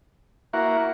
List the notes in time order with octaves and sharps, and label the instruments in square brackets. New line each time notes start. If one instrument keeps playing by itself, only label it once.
[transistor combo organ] A#3 F#4 [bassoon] E4